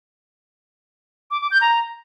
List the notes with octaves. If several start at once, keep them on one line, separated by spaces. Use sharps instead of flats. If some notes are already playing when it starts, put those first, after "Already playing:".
D6
D6
G6
A#5